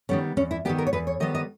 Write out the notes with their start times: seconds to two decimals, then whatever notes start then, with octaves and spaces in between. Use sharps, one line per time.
0.09 D#3 G3 B3 C#4
0.37 E2 C#4
0.51 E4
0.65 D#3 G3 B3 G4
0.78 A#4
0.87 C#5
0.93 E2 B4
1.07 C#5
1.20 D#3 G3 B3 D#5
1.35 D#5